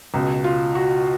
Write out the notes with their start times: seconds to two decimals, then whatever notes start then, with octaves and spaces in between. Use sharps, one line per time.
0.14 C#2 B2
0.44 F4
0.75 F#4